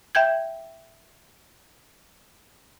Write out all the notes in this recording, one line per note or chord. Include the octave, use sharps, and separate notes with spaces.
E5 G5 G6 G#6